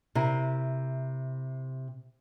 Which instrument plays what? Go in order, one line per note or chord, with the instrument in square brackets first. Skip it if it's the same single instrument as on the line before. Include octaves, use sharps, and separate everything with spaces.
[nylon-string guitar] C3 E4 A#4